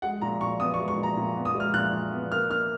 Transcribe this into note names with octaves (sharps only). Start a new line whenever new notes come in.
G#3 F#5
A#2 A#5
A#2 C#6
B3 D#6
C#6
G#3
C#6
A#2
A#5
A#2
B3
D#6
G#3
F6
A#2 F#6
A#2
B3
A#3 F6
A#3 F6